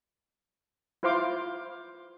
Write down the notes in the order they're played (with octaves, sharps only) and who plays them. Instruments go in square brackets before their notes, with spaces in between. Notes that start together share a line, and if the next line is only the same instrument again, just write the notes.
[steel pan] E4 F4 C5 F5 C6 D6